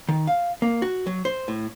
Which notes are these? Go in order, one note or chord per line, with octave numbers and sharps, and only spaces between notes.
D#3
F5
A#3
F#4
F#3
C5
A2